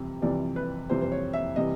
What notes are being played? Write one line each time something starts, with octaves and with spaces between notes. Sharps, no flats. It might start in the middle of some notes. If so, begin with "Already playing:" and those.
Already playing: F2 C3 E3 G3
F2 C3 E3 G3 D5
B4
F2 C3 E3 G3 C5
C5
C#5
E5
C3 E3 G3 D#5